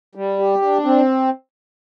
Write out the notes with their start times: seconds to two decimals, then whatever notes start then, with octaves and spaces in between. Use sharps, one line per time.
0.15 G3
0.39 G4
0.62 D4
0.85 C4